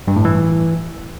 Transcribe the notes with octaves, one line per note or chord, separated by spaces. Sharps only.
G2
A2
E3